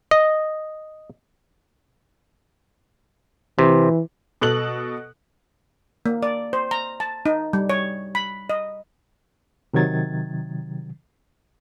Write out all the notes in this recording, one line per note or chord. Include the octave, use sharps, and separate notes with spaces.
D#5
C3 E3
B2 A4 F#6 F#7
A#3
D5
C5
A#5
A5
D#4
G3
C#5
B5
D#5
C3 D#3 F#3 G#6 A6